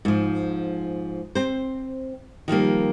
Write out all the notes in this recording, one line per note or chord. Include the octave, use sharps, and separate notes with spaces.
G#2 F3
C4 C5
D#3 F3 G3 A#3